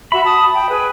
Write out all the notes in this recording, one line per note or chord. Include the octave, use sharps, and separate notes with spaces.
F#4 E5 B5
A5 D#6
G5
G#4 B4